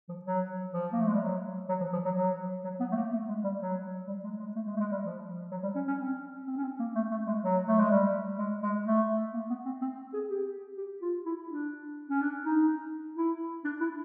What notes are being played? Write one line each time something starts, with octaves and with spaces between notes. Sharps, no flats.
F3
F#3
F3
A#3
A3
G#3
G3
F#3
F#3
F3
F3
F#3
F#3
F#3
B3
A3
A#3
A3
G#3
G3
F#3
G3
G#3
G#3
A3
G#3
A3
G#3
G3
F3
F#3
G3
C#4
C#4
C4
C4
C#4
C4
A#3
A3
A3
G#3
F#3
A3
G#3
G3
G#3
G#3
A3
A#3
B3
C4
C4
G#4
G4
G4
F4
E4
D4
C#4
D4
D#4
E4
D4
E4